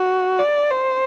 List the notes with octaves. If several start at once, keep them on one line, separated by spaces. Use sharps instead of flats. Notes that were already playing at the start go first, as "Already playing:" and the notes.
Already playing: F#4
D5
C5